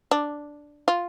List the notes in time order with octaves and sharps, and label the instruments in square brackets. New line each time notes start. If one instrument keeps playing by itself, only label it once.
[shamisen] D4
F4